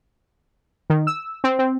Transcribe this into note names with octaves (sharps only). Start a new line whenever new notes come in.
D#3
E6
C4
C4